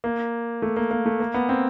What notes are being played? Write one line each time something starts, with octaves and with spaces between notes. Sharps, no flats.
A#3
A3
A#3
A#3
A3
A#3
B3
C4